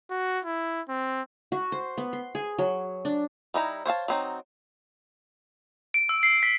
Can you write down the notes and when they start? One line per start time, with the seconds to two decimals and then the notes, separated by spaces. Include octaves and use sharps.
0.10 F#4
0.45 E4
0.89 C4
1.52 F#4
1.72 C5
1.98 B3
2.13 C6
2.35 G#4
2.58 F#3
3.05 D4
3.54 G3 D#4 E4 A#5
3.85 C5 C#5 F5 A5
4.08 F#3 C4 D#4
5.94 D7
6.09 E6
6.23 C7
6.43 B6